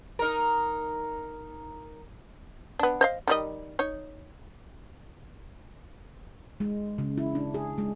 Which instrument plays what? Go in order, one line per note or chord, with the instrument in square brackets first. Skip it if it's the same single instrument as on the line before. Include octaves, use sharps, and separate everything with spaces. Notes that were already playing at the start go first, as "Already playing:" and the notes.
[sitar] D#4 A#4
[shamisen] B3 D4
C5 D#5 F5
D#3 G3 D#5
D#4 C#5
[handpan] G#3
C#3
E4
D4
G#4
G#3